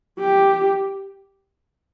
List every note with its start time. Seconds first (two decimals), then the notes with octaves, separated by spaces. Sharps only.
0.19 G4